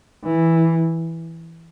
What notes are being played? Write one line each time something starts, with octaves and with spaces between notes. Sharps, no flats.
E3